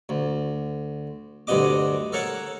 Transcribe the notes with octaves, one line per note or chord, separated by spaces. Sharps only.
D2
D2 G2 C3 F#4 D#5 D6
A4 A#4 C#5 F#5 A5